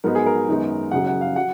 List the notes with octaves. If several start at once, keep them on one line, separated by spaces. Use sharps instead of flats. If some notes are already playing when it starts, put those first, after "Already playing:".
G#2 F#3 B3 D#4 A#4
G#4
A#4
F#2 D#3 G#3 B3 D#4
F#1 F#2 C#3 F#3 F#5
F#5
F5
F#3 F#5